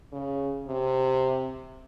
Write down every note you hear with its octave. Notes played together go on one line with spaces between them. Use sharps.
C#3
C3